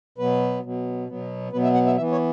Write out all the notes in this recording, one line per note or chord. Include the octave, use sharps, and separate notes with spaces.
B2 F#3 B3 B4
B2 F#3 B3
B2 F#3 B3
B2 F#3 B3 B4
E5
F#5
E5
E3 B3 E5
C#5